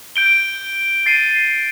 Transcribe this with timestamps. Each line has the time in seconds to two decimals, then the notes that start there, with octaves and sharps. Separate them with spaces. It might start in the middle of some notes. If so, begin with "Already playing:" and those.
0.16 G6 D7 G7
1.06 A6 C7 D#7